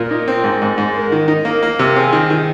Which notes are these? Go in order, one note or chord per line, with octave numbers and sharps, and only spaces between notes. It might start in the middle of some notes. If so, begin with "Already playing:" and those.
Already playing: A#2 A#4
D#4
C4
G#2
G#2
G#2
G#3 A#4
D#3
D#4
A#3 A#4
A#3
C3
C4 G#4
D#3
D#3